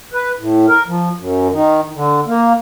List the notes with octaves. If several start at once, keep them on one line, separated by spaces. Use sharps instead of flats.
B4
A2
A#4
F3
F#2
D#3
D3
A#3